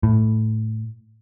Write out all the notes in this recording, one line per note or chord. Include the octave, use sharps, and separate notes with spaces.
A2